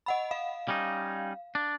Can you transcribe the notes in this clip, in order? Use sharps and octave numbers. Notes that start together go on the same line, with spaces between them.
D#5 F#5 B5
F5
G3 C#4 D#4
D4